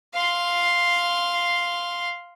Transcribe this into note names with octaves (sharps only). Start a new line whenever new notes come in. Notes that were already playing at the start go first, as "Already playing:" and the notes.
F5 C6